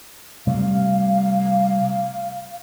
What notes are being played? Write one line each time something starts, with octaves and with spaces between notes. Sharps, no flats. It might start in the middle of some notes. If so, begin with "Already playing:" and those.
C3 G3 A3 F5